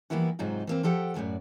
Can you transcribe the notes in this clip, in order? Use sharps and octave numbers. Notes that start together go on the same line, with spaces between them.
E3 G3 A#3 B3 E4 F#4
G#2 C3 F#3 D#4 F4
E3 A#3 C4
F3 G4 A4 F#5 G5
F#2 A2 E3 F#4 D5